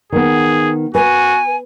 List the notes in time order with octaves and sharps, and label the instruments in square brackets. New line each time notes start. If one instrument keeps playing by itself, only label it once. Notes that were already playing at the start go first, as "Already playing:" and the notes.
[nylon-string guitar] D#3 B3 [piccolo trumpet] G#4
[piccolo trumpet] F#4 [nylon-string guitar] B4 [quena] G#5